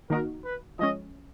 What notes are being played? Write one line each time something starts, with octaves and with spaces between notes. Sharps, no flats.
D#3 A#3 D#4 F#4 A#4
B4
F3 G#3 C#4 D#5